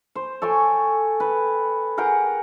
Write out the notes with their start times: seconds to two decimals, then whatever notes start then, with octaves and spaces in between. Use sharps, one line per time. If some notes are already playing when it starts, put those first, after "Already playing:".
0.15 C5
0.42 A4 C#5 G5 G#5
1.20 B4
1.97 G#4 A#4 F#5 G5